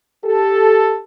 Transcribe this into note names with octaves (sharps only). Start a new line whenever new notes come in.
G4 A4